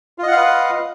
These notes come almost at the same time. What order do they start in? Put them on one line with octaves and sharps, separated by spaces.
F4 D#5 F#5 F5 B4